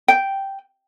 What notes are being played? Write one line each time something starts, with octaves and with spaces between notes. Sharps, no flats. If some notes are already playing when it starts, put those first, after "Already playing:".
G5